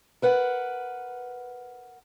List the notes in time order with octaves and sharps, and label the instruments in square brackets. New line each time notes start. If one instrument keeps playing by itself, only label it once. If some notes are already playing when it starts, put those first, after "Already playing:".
[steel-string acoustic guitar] A#4 B4 F#5